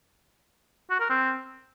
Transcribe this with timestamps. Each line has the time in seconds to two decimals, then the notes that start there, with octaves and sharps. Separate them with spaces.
0.91 F#4
1.00 A#4
1.10 C4